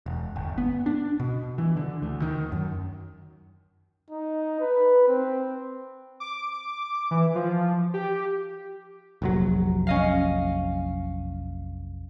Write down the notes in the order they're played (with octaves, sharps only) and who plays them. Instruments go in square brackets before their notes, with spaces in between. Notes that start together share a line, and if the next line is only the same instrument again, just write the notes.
[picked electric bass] E1
G1
B3
D4
B2
E3
D3
D2
D#3
F#2
[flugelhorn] D#4
B4
C4
[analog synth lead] D6
E3
F3
G4
[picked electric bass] F1 A#1 F#3
[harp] C#4 D#5 F5